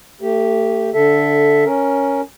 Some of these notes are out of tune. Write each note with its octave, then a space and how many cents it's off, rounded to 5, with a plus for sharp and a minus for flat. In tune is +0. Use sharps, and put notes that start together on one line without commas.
A3 +30 G4 +0
D3 -10 A4 +0 E5 +0
C#4 +0 A#4 +5